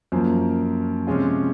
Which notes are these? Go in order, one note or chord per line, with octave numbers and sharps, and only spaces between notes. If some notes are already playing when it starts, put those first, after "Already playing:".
F#2 F3 A#3
C3 F3 G#3 C#4 F4